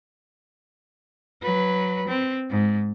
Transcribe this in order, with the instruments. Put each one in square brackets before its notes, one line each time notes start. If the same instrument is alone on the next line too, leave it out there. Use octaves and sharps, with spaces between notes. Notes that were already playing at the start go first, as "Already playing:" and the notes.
[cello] F#3 B4
C4
G#2